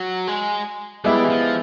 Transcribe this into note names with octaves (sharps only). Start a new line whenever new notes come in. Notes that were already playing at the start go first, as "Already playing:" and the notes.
Already playing: F#3
G#3
G3 G#3 B3 E4 G4
E3
F3